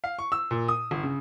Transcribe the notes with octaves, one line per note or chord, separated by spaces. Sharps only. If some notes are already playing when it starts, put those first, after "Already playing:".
F5
C#6
E6
A#2
D#6
G1
C#3